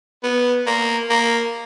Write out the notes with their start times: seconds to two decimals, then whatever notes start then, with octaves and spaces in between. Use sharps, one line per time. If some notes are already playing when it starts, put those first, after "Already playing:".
0.23 B3
0.66 A#3
1.10 A#3